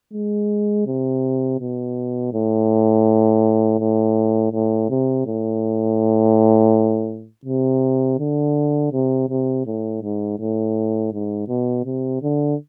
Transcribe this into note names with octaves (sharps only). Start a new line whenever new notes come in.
G#3
C3
B2
A2
A2
A2
C3
A2
C3
D3
C3
C3
A2
G#2
A2
G#2
B2
C3
D3